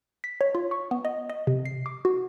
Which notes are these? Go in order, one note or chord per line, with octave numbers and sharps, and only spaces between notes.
B6
C#5
F4
C#6
B3
D#5
D#5
C3
C7
D6
F#4